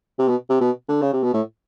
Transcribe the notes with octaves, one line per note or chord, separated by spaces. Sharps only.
C3
B2
C3
B2
D3
C#3
C3
B2
A2